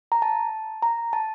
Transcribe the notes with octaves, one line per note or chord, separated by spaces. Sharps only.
A#5
A5
A#5
A5